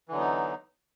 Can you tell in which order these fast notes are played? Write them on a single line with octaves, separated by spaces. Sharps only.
E3 D3 F#3 B3 D#4